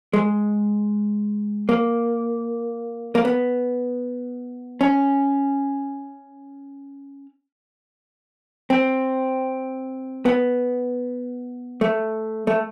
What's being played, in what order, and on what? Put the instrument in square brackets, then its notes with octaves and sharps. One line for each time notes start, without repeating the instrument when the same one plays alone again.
[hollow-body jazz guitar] G#3
A#3
A#3
B3
C#4
C4
B3
A3
A3